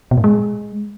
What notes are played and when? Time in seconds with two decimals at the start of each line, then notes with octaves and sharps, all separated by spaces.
0.11 B2
0.18 A2
0.24 G#3